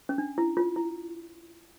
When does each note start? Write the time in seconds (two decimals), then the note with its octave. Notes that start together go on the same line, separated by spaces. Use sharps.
0.09 C#4
0.18 D4
0.38 E4
0.57 F4
0.76 E4